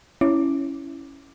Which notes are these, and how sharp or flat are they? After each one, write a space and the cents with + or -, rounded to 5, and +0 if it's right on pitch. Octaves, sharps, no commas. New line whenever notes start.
C#4 +0 E4 +0 D6 +0